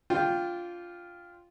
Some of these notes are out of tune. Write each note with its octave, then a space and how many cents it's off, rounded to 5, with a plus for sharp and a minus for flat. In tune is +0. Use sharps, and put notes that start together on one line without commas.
D4 -25 F4 +0 G5 +0